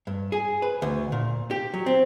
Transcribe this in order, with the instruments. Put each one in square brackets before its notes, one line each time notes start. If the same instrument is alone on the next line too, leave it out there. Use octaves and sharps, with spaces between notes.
[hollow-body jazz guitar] G2
G#4
B4
D2
A#2
G4
F#3
C4